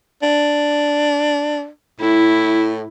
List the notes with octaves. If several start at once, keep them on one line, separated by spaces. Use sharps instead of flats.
D4
A2 E4